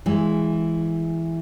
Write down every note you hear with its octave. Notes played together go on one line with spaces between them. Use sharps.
E3 G#3